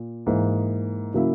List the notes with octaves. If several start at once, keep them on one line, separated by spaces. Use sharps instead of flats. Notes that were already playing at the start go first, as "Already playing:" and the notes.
Already playing: A#2
G#2 E3 A#3
C#3 F#3 A#3 E4